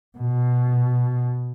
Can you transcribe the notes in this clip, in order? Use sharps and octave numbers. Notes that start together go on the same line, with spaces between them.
B2